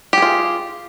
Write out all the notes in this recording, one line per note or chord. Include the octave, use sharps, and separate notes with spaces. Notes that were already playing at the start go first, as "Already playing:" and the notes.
F4 G4 G#4